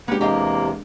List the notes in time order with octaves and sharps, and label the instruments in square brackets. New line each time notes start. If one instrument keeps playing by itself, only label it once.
[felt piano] G#3 D4 [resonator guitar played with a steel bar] A#3 G4 [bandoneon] B4 F#5
[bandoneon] E2 C3 [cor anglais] A#3 [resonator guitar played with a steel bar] G4 D#5 F5